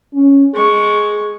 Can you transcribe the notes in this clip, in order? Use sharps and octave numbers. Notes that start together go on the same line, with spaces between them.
C#4
G#3 G#4 C#6